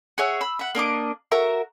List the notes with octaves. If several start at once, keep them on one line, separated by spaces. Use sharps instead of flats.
F#4 G#4 C#5 E5
B5 E6
E5 F#5
A#3 D4 D#5 D6
F#4 A#4 E5 A#5